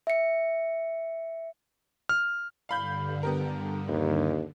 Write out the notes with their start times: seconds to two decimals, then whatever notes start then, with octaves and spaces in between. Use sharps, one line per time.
0.07 E5 C#7
2.09 F6
2.69 G2 D3 F5 B5 G6
3.23 B3 G4 A#4
3.89 D#2